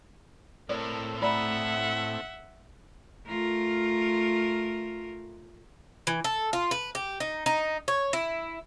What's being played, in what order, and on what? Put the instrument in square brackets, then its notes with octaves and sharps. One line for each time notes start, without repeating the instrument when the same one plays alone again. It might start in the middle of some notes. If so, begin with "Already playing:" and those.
[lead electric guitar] A2 [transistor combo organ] A3 C4 E4 [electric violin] A#4 [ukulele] C#5 D5
[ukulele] D5 A#5 B5 [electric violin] E5 F#5
[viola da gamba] A3 F4 A#4
[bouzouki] E3
A4
F4
B4
G4
D#4
D#4
C#5
E4